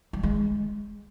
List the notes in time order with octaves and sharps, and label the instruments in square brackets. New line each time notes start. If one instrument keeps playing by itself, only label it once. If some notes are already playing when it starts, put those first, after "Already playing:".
[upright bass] G3
G#3